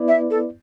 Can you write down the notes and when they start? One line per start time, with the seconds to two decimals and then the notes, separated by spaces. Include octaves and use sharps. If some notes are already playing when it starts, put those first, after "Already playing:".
Already playing: B3 E4 B4 D5
0.08 E5
0.31 A4